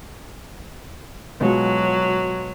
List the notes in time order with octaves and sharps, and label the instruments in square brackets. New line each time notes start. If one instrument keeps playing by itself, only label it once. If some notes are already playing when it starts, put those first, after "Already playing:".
[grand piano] B2 G#3 F4 [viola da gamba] F#3